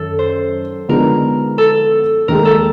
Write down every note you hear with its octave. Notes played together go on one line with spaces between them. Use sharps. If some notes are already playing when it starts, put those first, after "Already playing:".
Already playing: F#2 D#3 A4
C5
D3 F3 G#3 B3 D#4 A#4
A4
D#2 D#3 G#3 A#4
A4